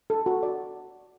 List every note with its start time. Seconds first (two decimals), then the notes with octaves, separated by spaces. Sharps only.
0.10 A4
0.26 F#4
0.43 D5